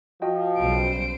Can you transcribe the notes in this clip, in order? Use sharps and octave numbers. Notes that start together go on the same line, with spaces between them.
F3 F#4 D#5 G5
B1 C#3 G3 C5 D7